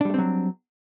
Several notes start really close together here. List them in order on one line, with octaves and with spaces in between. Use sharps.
D4 G3 A3 C4 F#3